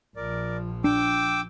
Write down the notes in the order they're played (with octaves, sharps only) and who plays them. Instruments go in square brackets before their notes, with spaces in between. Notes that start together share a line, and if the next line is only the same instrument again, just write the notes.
[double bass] A#1 F3 [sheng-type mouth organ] A#4 D5
[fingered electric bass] D4 [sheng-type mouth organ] G5 D6 E6